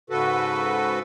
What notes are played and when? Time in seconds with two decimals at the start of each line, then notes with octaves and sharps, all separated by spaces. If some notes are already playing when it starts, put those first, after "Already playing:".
0.10 G#2 C#3 F#4 A4 B4